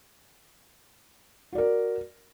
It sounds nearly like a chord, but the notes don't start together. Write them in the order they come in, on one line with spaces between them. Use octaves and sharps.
F#4 D5 A#4